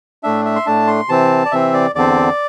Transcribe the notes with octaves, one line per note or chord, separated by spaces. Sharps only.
A2 A3 D4 E5
E5
C6
A2 A3 D4 A5
C6
C3 E3 C4 A5
D5
C3 E3 C4 E5
D5
E2 D3 C4 D5